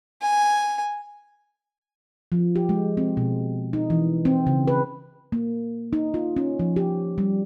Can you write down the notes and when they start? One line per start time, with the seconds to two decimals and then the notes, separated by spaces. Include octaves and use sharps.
0.22 G#5
2.32 F3
2.56 G4
2.69 G#3
2.97 C4
3.17 B2
3.73 D#4
3.90 E3
4.25 C4
4.47 C#3
4.67 B4
5.32 A#3
5.93 D#4
6.14 F4
6.36 C#4
6.59 F3
6.76 G4
7.18 G3